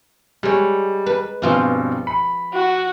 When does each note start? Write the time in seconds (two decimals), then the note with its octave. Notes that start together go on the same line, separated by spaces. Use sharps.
0.43 G3 G#3 C#5
1.06 B4
1.42 G2 B2 F3 C4 F4 G#4
2.07 B5
2.53 F#4